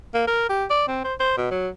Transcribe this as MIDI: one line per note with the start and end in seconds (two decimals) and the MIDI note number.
0.14 0.23 58
0.27 0.45 70
0.49 0.65 67
0.70 0.85 74
0.87 1.03 60
1.04 1.14 72
1.20 1.36 72
1.37 1.48 47
1.51 1.68 54